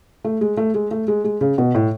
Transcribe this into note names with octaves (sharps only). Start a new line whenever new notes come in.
A3
G#3
A3
G#3
A3
G#3
G#3
C#3
B2
A2